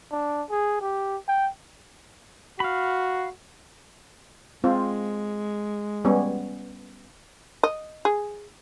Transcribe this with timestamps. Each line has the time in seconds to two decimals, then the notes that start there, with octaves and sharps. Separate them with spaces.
0.12 D4
0.50 G#4
0.81 G4
1.28 G5
2.60 F#4 F5 B5
4.64 G#3 C4 F4 C5
6.05 G3 B3 C#4
7.63 D#5
8.05 G#4